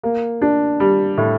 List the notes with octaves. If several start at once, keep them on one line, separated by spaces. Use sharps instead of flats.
A#3
D4
G3
A2